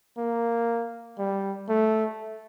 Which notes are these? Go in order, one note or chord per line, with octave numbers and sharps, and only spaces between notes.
A#3
G3
A3